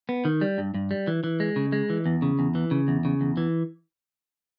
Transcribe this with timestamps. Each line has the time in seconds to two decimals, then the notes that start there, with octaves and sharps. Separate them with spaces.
0.09 B3
0.25 D#3
0.41 G3
0.58 G2
0.74 G2
0.91 G3
1.07 E3
1.24 E3
1.40 G#3
1.56 C#3
1.72 G#3
1.90 E3
2.06 E2
2.22 C#3
2.39 E2
2.55 E3
2.71 C#3
2.88 E2
3.05 C#3
3.21 E2
3.37 E3